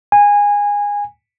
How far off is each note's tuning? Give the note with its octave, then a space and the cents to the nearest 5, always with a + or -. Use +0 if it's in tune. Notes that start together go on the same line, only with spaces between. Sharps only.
G#5 -20